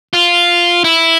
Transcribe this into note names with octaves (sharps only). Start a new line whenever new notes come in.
F4
E4